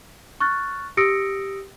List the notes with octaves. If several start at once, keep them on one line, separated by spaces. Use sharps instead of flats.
C#6 F6 F#6 A6
G4 D#6 E6 A#6 C#7 D7